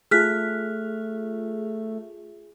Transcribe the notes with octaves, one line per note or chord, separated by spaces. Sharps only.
A3 F4 G#4 F6 F#6 B6